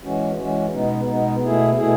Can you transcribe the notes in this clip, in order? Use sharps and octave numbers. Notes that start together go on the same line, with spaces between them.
E3 G#3 C#4 F#4
E3 G#3 C#4 F#4
B2 G#3 B3 D#4
B2 G#3 B3 D#4
B2 A3 E4 G#4
B2 A3 E4 G#4